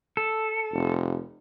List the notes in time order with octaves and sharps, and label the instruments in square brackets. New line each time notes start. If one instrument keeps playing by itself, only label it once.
[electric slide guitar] A4
[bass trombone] F1